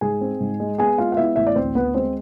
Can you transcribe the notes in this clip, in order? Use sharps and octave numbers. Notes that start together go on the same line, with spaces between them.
G#2 G#4 G#5
C4
G#2
G#3
B3 G#4 G#5
G#3 F4 F5
F5
B3 E4 E5
A1 E5
D5
D2 C4 C5
D2 B3 B4
G#3 C4 C5